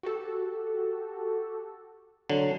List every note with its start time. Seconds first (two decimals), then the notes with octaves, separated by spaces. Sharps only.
0.03 F#4 G4 A4
2.29 D3 F#3